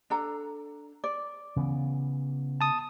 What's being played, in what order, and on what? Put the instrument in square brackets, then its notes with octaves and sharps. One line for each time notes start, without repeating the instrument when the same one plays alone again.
[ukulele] D4 A4 A#5
D5
[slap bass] C#3 E3 B3
[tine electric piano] A5 D#6